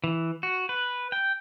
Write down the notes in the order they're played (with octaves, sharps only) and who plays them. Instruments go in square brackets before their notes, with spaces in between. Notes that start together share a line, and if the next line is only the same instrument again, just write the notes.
[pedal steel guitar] E3
F#4
B4
G5